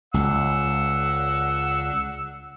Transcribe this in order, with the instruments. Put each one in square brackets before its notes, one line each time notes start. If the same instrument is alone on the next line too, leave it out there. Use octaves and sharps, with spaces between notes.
[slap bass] C#2 [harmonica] F#5 E6